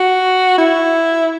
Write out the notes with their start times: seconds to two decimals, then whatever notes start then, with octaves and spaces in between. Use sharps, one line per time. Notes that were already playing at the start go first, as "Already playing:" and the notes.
Already playing: F#4
0.58 E4